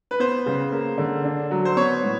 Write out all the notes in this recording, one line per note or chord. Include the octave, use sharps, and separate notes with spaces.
B4
B3 C5
C#3
A#3
D3
D4
F#3
C5
B3 C#5
A2